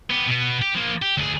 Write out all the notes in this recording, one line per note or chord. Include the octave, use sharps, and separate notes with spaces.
B3 G4
B2 B3
G4
F3 A#3
G4
D2 G#4